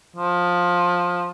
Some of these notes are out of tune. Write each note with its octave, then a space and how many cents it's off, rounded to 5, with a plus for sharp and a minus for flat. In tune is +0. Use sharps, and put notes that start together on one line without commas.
F3 +15